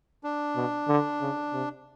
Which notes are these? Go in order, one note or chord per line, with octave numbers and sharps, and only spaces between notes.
D4
B2
D3
C#3
C3